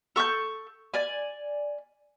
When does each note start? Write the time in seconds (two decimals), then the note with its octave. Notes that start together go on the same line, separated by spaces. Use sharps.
0.16 A4 C#6 E6 G6
0.94 D5 G#5